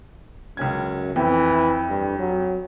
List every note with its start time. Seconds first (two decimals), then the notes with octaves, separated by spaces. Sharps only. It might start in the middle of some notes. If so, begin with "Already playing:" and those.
0.57 C#2 F#2 C#4 G#6
1.16 F2 E3
1.89 G2
2.19 F#3